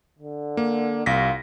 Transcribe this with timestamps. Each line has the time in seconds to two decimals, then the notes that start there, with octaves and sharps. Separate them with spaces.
0.19 D3
0.57 A#3
1.06 C2 F4 A#6 B6